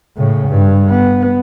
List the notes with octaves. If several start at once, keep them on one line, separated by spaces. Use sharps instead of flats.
A2 C#3
G2
B3